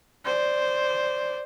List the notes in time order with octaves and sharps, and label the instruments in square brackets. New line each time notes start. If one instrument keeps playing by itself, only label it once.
[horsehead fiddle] C5 D5